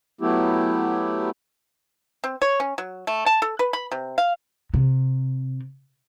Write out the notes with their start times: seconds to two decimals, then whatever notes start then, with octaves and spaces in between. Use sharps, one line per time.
0.21 F#3 A3 B3 E4 G4
2.24 C4
2.42 C#5
2.60 C#4
2.78 F#3
3.07 A3
3.26 A5
3.42 A4
3.59 B4
3.73 B5
3.92 C3
4.18 F5
4.74 C3